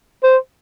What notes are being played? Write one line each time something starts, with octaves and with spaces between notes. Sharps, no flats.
C5